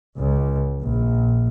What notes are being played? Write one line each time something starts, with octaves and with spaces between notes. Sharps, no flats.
C#2
A#1